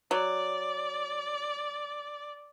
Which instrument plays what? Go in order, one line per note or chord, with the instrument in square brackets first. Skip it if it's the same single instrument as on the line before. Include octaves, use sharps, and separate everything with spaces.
[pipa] F#3 [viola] D5